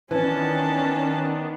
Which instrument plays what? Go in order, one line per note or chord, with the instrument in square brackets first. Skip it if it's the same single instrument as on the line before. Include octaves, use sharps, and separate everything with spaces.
[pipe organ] D#3 B3 D4 [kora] E3 [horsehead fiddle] C#4 A5